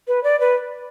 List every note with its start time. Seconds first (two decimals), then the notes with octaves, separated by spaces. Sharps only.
0.08 B4
0.24 D5
0.40 B4